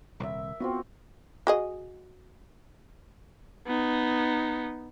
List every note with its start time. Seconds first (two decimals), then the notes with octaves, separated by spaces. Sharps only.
0.20 D#1 C2 A#4 E5
0.60 B3 C4 F4 F#4
1.47 F#4 G#4 D#5
3.67 B3 D#4